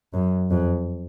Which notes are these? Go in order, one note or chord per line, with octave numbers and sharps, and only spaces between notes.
F#2
F2